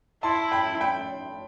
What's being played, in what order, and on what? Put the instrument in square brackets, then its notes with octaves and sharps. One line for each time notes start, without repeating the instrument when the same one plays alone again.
[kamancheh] E4 [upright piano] A5 C6
[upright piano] G5 B5
G5 B5